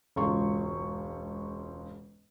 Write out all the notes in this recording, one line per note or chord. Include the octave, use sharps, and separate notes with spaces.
E1 C#2 G#2 F4 C#6